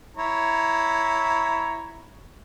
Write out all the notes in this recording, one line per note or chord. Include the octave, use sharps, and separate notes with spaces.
E4 C#5 A#5